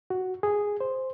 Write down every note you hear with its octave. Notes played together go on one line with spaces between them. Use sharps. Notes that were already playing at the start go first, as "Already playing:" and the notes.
F#4
G#4
C5